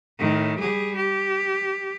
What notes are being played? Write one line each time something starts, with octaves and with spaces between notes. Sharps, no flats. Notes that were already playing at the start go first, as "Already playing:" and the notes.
A2 D#3
G3 G#4
G4